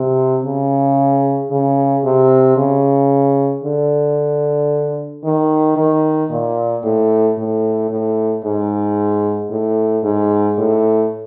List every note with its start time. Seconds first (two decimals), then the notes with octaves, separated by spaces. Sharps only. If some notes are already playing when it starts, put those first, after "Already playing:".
Already playing: C3
0.44 C#3
1.51 C#3
2.04 C3
2.57 C#3
3.64 D3
5.24 D#3
5.77 D#3
6.30 A#2
6.84 A2
7.38 A2
7.90 A2
8.45 G#2
9.50 A2
10.04 G#2
10.58 A2